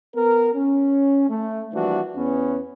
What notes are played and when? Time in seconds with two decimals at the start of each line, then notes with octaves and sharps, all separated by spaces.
0.15 B3 A#4
0.54 C#4
1.29 A3
1.73 E3 F3 G3 A#3 D4 F#4
2.16 E2 B3 C#4